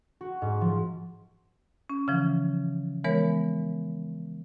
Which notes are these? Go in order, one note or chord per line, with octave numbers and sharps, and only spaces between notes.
F#4
G#2
F3
C#4
C#3 E3 F3
E3 G#3 B3 A#4 C#5